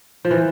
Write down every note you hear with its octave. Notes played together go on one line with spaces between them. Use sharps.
F3
E3